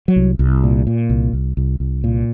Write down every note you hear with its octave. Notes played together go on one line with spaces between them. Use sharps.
F#3
C2
C2
A#2
A#2
C2
C2
C2
C2
A#2